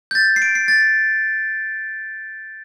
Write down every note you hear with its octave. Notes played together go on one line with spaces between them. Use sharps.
G6
A6
C7
D7
C7
A6